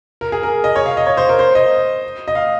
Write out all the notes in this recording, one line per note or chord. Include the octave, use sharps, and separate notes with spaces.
A#4
G#4
A#4
D#5
C#5
F5
D#5
C#5
C5
A#4
C5
D#5
D#5
F5